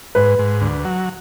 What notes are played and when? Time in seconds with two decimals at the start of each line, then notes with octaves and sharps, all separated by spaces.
0.15 G#2 B4
0.39 G#2
0.61 D2
0.85 F#3